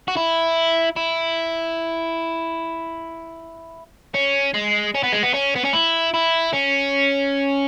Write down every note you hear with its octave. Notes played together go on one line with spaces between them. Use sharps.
F#4
E4
E4
C#4
G#3
C#4
B3
G#3
B3
C#4
B3
C#4
E4
E4
C#4